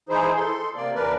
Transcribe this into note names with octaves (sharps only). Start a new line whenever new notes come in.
E3 D#4 E4 G#4 C5
A4 C6
C3 A#3 D5
D#2 E3 D4 A#4 B4 D5